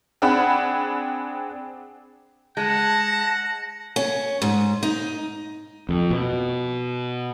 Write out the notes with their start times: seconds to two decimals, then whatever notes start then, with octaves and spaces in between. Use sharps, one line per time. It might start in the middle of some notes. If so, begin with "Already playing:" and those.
0.22 C4 D4 G#4 F#5 B5
2.57 G#3 F#5 A5 A#6
3.96 C#4
4.42 G#2
4.83 D#4
5.89 F2
6.11 B2